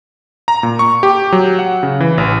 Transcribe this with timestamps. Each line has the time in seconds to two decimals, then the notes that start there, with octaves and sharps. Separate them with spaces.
0.48 A#5
0.63 A#2
0.79 C#6
1.03 G4
1.32 F#3
1.59 F#5
1.83 C#3
2.00 E3
2.18 A1